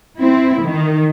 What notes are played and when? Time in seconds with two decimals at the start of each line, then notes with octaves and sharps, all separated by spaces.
0.19 C4 E4
0.63 D#3